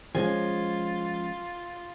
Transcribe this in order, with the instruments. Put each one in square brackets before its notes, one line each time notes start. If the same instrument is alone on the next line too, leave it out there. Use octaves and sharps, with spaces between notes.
[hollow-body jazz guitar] F3 G#3 C#4 [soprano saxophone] F4 [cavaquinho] G#5